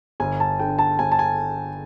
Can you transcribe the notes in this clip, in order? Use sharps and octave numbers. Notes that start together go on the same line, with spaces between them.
G1 G#5
A5
D3 G5
A5
G1 G#5
A5
G#5